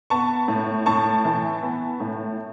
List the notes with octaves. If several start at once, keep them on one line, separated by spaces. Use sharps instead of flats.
B3 A5 C#6
A2
A2 A5 C#6
E3
B3
A2